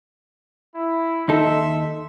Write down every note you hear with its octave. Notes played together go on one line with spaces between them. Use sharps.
E4
D#2 D#4 A4 E5 C6